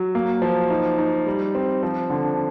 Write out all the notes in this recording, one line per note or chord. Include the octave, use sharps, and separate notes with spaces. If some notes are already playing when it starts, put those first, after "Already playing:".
Already playing: F#3
A#3
F3
D#4
D#4
G3
C4
F3
D3